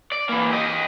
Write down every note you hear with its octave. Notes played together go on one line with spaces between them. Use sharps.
D5
E3 A#3
G4 D#5